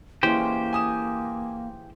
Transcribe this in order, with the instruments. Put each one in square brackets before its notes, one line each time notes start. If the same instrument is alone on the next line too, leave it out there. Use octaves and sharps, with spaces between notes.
[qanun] E3 G#3 C#4 [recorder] A#3 [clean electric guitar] G4 C5
[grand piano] G#5 D#6 E7